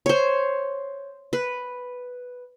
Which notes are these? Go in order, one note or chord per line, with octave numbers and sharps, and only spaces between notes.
C5 C#5
B4